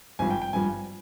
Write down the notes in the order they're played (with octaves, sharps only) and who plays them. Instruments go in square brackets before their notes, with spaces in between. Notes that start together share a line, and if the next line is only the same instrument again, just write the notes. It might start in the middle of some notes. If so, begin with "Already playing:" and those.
[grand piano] G#1 G2 F3 G#5
G5
G5
G#1 G2 F3 G#5